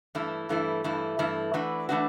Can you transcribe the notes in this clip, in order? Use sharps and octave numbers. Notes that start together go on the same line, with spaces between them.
G2 E3 A3 E4
G2 E3 A3 E4
G2 E3 A3 E4
G2 E3 A3 E4
E3 A3 D4 F#4 B4
E3 A3 D4 F#4 B4